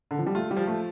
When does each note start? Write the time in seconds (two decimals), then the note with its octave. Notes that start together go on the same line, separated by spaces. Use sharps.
0.11 D3
0.19 F3
0.26 G3
0.35 A3 F4
0.51 G3
0.57 F3
0.67 A3